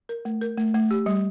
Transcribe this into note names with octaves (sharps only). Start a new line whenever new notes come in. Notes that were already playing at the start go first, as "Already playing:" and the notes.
A#4
A3
A#4
A3
A3
G4
G3